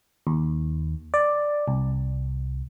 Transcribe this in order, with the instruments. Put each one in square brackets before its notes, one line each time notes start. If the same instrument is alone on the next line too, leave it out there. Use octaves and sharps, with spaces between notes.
[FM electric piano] D#2
D5
C2